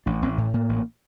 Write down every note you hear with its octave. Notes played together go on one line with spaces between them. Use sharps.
A1 D4
A1 C4
A2
A2 A#3
A1